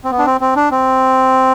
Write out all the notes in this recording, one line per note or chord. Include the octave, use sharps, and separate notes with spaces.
C4
B3
D4
C4
C4
D4
C4